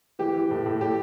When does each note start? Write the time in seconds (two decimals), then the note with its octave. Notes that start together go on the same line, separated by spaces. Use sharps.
0.19 E3 G4
0.34 E3
0.51 A2
0.66 A2
0.81 A2 G4